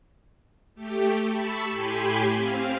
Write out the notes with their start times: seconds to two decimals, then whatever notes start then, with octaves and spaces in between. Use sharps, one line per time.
0.75 A3 G4
1.29 A5 B5 C#6 E6
1.69 A2 G4 G#5 B5 C6
2.35 C4 F5